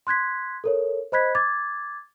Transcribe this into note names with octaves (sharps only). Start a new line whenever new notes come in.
C6 F#6 G#6 B6
A4 A#4 C#5
C5 D#5 B5 F#6 G#6 B6
D6 G#6 A6